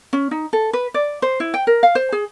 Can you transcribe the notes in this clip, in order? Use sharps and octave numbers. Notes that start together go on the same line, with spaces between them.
C#4
D#4
A4
B4
D5
C5
E4
G5
A#4
F5
C5
G#4